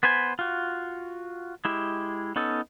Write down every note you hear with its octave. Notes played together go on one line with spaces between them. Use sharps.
B3 B4 C5 G#5
F4 F#4
G#3 E4 G4
B3 C#4 D#4 A4